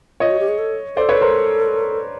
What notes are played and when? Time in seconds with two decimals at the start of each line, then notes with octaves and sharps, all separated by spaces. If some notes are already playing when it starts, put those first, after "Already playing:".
0.20 F4 C#5 D#5
0.31 F#4
0.40 G4
0.49 G#4
0.58 A4
0.96 A4 C5 D5
1.09 B4 C#5
1.21 A#4 C5